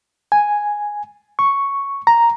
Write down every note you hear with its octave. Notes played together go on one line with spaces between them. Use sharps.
G#5
C#6
A#5